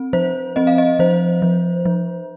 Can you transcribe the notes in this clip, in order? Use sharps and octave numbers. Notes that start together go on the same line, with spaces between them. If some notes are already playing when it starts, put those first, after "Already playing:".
Already playing: C4
F3 C5
C4 D#5
F5
D#5
F3 C5
F3
F3